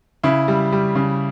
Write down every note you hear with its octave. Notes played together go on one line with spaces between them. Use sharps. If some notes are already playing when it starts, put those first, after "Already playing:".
C#3 E4
G3
G3
C#3